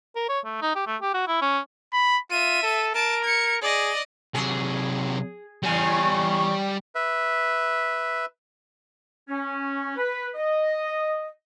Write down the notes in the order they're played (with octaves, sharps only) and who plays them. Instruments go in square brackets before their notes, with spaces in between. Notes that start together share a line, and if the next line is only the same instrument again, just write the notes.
[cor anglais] A#4
C#5
A3
D#4
G4
A3
G4
F#4
E4
C#4
[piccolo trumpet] B5
[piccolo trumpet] F4 [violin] E5 D#7
[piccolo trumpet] A4
[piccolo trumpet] A#4 [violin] A5 D7
[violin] G#6 C#7
[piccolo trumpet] G#4 [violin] D5 D#5
[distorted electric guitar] C3 F#3 [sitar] G#4
[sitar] E2 C#3 [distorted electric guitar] G3 G#5
[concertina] B4 E5
[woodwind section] C#4
B4
D#5